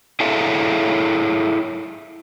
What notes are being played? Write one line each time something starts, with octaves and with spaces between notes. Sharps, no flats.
E4 G#4 A4 C#5 E5 F5